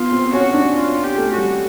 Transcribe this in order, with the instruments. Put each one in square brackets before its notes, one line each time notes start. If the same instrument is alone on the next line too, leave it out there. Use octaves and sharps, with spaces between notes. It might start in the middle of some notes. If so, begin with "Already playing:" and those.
Already playing: [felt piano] B3 [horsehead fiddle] F4
[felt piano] C4
[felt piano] C#4 [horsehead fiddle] F#4
[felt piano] D4
[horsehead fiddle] F4
G4
[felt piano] A3
[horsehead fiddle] F#4
[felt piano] G3